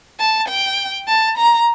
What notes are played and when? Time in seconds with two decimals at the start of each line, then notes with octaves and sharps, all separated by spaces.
0.20 A5
0.48 G5
1.08 A5
1.37 A#5